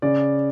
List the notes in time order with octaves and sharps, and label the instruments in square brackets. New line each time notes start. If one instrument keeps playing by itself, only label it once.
[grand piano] C#3 D5